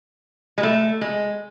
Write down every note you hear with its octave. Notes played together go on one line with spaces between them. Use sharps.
G#3
A3
G#3